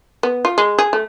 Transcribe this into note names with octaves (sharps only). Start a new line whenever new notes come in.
B3
F4
G#3
G#4
A3